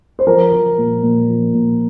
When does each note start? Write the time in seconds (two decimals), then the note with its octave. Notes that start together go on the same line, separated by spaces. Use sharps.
0.19 C5
0.27 F3 A#4
0.52 F3
0.78 A#2
1.03 A#2
1.29 F3
1.54 A#2